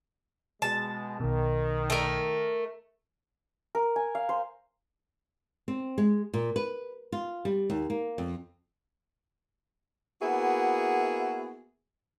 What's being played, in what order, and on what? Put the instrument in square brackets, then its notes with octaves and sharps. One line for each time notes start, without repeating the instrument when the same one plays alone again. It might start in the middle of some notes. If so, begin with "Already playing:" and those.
[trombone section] B2 G#3 [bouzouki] A5
[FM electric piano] B1 B2 [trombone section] D#3
[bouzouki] A3 A#4
[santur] A#4
G#5
F5
C5
[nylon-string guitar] C4
G#3
A#2
B4
F4
G3
D#2
A#3
F2
[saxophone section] A#3 B3 E4 F#4 G#4